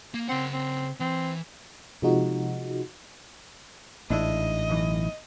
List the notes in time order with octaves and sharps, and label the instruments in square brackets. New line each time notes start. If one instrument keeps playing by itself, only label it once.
[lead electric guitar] A#3
[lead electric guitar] C#3 F#5 [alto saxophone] C4
[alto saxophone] C4
[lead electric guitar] E3 [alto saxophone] C4
[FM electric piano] C3 F3 G#3 D#4 F#4
[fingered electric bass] A1 [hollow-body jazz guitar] G#2 D4 E4 [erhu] D#5
[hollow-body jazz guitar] B1 E3